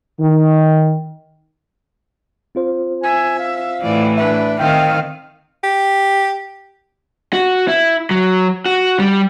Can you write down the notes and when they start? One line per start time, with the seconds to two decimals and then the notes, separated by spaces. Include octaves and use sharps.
0.20 D#3
2.55 C4 F4 C5
3.04 E5 G#5
3.39 F5
3.82 A2 E3 D5
4.18 D4 B4 E5
4.59 D#3 C4 F5 G5
5.64 G4
7.33 F#4
7.68 E4
8.11 F#3
8.66 F#4
9.00 G3